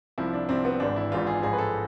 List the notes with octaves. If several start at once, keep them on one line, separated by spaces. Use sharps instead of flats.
C2 C3 F3 E4
D4
C2 C3 F3 C4
B3
G#1 G#2 E3 D4
E4
G#1 G#2 E3 F4
G#4
A1 G#2 F3 G#4
B4
A4